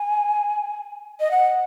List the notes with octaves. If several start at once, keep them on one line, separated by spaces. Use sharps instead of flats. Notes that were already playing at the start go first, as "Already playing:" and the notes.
Already playing: G#5
D#5
F#5